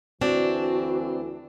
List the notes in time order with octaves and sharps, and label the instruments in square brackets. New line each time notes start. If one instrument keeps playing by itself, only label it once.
[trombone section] D2 E3 [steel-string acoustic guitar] C4 [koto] D4 [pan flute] F#4